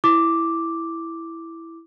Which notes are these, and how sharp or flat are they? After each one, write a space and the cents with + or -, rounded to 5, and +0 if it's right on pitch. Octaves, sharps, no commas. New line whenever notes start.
E4 +0 D6 +0